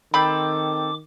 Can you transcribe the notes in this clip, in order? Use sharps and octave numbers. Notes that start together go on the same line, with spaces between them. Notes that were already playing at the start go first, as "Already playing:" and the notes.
D#3 C4 A4 G5 B5 D6